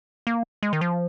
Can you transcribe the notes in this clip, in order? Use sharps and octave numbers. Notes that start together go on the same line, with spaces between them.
A#3
G#3
D#3
F3